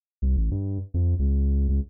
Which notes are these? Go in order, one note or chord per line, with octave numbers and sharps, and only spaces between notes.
C2
A1
G2
F2
C#2
C#2